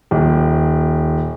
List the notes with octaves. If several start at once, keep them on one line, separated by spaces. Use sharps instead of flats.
D#1